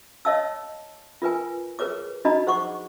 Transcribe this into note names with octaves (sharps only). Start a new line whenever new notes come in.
C#5 D#5 F5 A5 E6
F4 A#4 B4 G#5
G#4 A#4 B4 C#5 D6
D4 D#4 F#4 D#5 A#5 B5
G#4 C5 F#5 C#6 D6